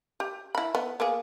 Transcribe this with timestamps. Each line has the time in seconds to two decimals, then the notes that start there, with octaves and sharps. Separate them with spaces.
0.20 G4
0.55 E4 B5
0.75 B3
1.00 A#3 B3 G#4